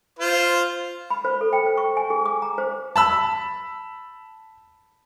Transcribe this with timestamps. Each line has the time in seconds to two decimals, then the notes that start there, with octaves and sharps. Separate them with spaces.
0.19 F4 C5
1.10 B5
1.25 C5
1.41 A4
1.53 G5
1.66 C5
1.77 C#6
1.97 G#5
2.10 G#4
2.26 D6
2.42 A#5
2.58 C5
2.96 A5 B5 E6